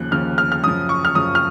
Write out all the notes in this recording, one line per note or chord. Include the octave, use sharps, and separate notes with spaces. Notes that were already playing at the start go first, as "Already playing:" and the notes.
Already playing: D#2 C#3 F3 F#6
D#2 C#3 F3 F6
F6
F6
F#2 C#3 F3 D#6
C#6
F6
F#2 C#3 F3 D#6
F6